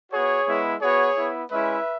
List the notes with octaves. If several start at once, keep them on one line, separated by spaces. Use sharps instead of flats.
B3 F#4 G#4 C#5
G#3 B3 E4
B3 F#4 G#4 C#5
B3 E4
G#3 C#4 E4 B4 E5